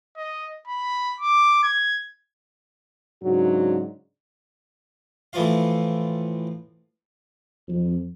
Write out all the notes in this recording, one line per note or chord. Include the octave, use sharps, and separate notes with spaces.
D#5
B5
D6
G#6
G#2 C#3 F#3 D4 F#4
A2 E3 F3 F4 F5
F2